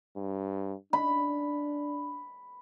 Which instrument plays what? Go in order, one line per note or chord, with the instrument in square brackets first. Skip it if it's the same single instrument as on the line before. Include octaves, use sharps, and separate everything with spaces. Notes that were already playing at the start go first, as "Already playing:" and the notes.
[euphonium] G2
[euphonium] D4 [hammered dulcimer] B5